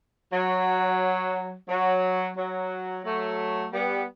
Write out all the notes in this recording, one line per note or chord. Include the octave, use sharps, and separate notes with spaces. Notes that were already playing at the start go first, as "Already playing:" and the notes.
F#3
F#3
F#3
F#3 A3
G3 B3